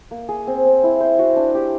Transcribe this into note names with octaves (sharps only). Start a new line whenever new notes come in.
A#3
G#4
C4
C4
E4
C5
F#4
D4
G4